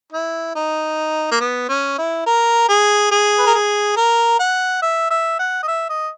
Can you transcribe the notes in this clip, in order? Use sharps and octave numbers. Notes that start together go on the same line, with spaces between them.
E4
D#4
A#3
B3
C#4
E4
A#4
G#4
G#4
B4
A#4
G#4
A#4
F#5
E5
E5
F#5
D#5
E5
D#5